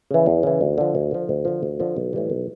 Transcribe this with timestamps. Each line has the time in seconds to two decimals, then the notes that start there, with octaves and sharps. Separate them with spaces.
0.11 C#3 E3
0.26 E2
0.43 C#3 E3
0.61 D2
0.78 D3 F3
0.95 D2
1.11 D3 F3
1.29 D2
1.45 D3 F3
1.63 D2
1.80 D3 F3
1.96 B1
2.13 A2 E3 G3
2.30 B1